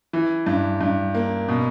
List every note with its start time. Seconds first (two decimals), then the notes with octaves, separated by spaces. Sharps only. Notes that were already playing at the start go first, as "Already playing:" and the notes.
0.13 E3
0.46 G2
0.81 G2
1.15 A#3
1.48 B2